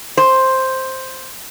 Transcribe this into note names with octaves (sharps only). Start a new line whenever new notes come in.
C5